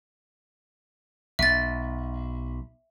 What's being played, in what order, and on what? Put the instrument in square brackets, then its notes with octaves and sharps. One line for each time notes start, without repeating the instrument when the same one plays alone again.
[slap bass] B1 [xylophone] E5 A6